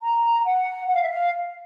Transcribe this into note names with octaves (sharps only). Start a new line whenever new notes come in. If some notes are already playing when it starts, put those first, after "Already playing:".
A#5
F#5
F#5
F5
E5
F5